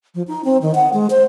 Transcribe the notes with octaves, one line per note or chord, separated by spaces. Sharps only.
F3
D#4
C4
D#3
F#5
G#3
C5